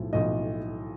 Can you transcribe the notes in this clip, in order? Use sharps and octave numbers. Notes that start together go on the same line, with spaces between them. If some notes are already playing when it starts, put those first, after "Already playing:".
Already playing: B1 A2 F3
B1 A2 F3 D#5